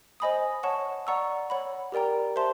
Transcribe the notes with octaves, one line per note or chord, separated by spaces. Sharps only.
C5 D#5 G#5 B5 D#6
C#5 F#5 A5 C#6
D5 F#5 A#5 C#6 E6
C#5 F#5 B5
G4 A#4 D5 G5 A#5
G4 C5 E5 A5 C6